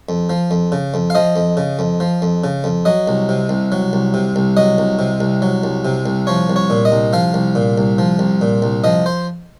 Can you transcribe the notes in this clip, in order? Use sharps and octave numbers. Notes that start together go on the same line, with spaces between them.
F2
F3
F2
C#3
F2
F5
F3 D#5
F2
C#3
F2
F3
F2
C#3
F2
F#3 D#5
C2
C3
C2
F#3
C2
C3
C2
F#3 D#5
C2
C3
C2
F#3
C2
C3
C2
F3 C#5
C2
C#5
A#2
D#5
C2
F3 F5
C2
A#2
C2
F3
C2
A#2
C2
F3 D#5
C5